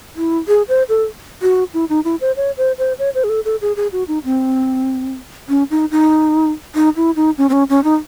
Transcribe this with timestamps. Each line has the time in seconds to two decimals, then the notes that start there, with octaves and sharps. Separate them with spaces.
0.16 E4
0.48 G#4
0.68 C5
0.89 A4
1.42 F#4
1.74 E4
1.89 D#4
2.05 E4
2.21 C5
2.37 C#5
2.57 C5
2.78 C5
2.99 C#5
3.15 C5
3.24 G#4
3.29 A4
3.45 A4
3.61 G#4
3.76 G#4
3.93 F#4
4.08 D#4
4.25 C4
5.49 C#4
5.71 D#4
5.91 D#4
6.75 D#4
6.96 E4
7.16 D#4
7.38 C#4
7.49 C4
7.53 C#4
7.69 C#4
7.84 D#4